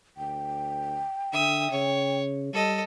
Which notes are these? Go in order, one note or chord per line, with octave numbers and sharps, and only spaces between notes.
D2 G5
D3 E5 D#6
C#3 C#5
G3 A4 D#5